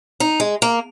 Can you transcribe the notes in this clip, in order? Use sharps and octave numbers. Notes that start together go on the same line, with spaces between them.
D#4
G#3
A#3